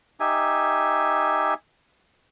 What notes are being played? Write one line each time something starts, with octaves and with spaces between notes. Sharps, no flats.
D#4 G4 E5 G#5